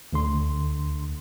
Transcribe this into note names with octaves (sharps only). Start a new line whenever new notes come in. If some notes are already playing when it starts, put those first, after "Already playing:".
D2 D3 C6